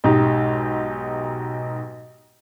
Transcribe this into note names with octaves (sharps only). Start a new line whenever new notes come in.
B1 G#2 D#4 G4